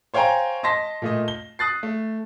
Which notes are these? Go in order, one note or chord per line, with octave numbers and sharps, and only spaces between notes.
C5 C#5 F5 G5 G#5 A#5
D#5 A5 C6 A#6 B6
A#2 A3 D#5
G7
D#6 F#6 A6 C7
A3